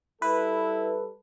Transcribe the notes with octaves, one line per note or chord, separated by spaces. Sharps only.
G3 E4 A4 B4